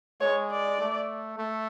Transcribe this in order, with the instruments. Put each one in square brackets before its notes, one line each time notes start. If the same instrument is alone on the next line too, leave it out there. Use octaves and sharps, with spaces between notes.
[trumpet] G#3 [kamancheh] C#5
[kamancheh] D5
[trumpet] A3
A3